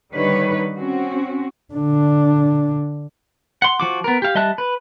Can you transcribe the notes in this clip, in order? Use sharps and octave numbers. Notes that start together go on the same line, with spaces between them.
D3 D#3 G3 D#4 B4 C#5
C4 C#4 F#4
D3 D4
F#5 C6
F3 F#4 D6
B3 A#4
G4 F5
G3 D#5 E5 A5 F#6
B4